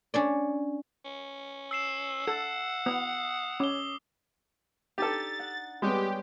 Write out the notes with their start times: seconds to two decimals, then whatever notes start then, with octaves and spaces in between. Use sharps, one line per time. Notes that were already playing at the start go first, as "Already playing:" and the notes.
0.14 C#4 D4 D5
1.05 C#4
1.71 E6 C7 E7
2.27 A4 F#5
2.86 B3 D#6
3.60 C#4 D6 G7
4.98 D4 D#4 G4 A4 A6
5.39 F#5
5.82 G3 G#3 B3 G4 C#5 G5